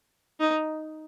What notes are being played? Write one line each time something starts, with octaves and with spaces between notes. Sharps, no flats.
D#4